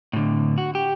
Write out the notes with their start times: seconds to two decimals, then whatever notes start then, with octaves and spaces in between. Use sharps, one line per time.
0.13 A2 D3
0.58 F#4
0.75 G4